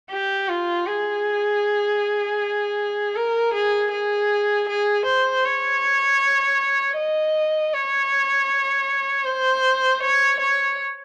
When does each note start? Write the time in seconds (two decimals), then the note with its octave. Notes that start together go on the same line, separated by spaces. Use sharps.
0.10 G4
0.48 F4
0.87 G#4
3.16 A#4
3.53 G#4
3.91 G#4
4.68 G#4
5.05 C5
5.45 C#5
6.97 D#5
7.73 C#5
9.25 C5
10.03 C#5
10.39 C#5